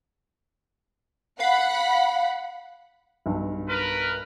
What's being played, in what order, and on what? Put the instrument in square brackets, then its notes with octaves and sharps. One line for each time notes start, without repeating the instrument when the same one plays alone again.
[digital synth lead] F5 [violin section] F#5 B5
[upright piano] B1 G2
[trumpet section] A#4 B4